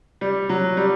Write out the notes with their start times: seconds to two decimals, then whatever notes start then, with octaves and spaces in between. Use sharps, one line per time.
0.21 G3
0.49 F#3
0.77 G3